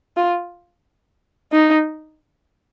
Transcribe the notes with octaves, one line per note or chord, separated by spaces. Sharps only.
F4
D#4